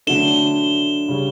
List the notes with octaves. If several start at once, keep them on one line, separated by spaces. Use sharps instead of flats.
D3 F#3 A3 D4 E7 G7
C#3 G3 C#4